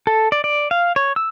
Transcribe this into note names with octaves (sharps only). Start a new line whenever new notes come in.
A4
D5
D5
F5
C#5
E6